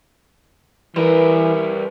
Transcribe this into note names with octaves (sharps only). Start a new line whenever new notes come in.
E3 G3 A#4 B4